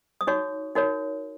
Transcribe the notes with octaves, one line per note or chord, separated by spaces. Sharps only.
D#6
D#4 F#4 C#5 C#6
D#4 F#4 A#4 C#5